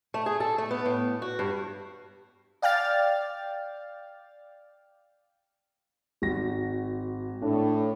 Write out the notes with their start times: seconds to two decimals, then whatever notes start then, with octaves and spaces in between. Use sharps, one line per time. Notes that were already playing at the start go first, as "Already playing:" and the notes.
0.14 A3
0.26 G#4
0.40 A4
0.58 A3
0.71 B3
0.86 A2
1.22 F#4
1.39 G2
2.62 D5 F5 G5 F6 A6
6.22 G#1 F#4 A#6
7.42 A2 D4